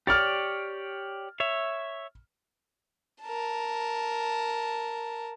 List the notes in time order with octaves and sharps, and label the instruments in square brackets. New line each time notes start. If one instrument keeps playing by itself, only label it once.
[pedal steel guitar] G4 C#5 D5 [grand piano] F6 A6
[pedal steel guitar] C#5 E5
[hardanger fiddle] A#4 A5